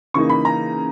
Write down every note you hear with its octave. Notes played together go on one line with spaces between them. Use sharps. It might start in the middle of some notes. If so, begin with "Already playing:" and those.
C#3 E3 A#3 D#4 C#6
B5
A#5